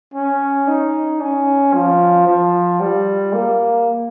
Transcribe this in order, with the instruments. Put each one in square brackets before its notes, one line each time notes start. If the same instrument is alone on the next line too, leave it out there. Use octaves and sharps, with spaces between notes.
[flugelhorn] C#4
D#4
C#4
F3
F3
G3
A#3